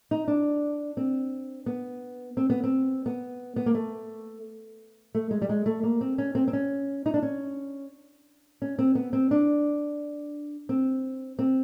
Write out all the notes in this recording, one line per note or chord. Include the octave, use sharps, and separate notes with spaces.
D#4
D4
C4
B3
C4
B3
C4
B3
B3
A#3
A3
A3
G#3
G3
G#3
A3
A#3
C4
C#4
C4
C4
C#4
D#4
D4
C#4
C#4
C4
B3
C4
D4
C4
C4